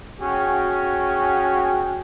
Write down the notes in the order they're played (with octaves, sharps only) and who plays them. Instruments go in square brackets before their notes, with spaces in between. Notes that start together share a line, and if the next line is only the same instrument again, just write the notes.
[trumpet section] C#4 F#4 G#4 G5